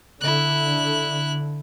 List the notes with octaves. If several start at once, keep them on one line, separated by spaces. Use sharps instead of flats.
D3 E4 F#6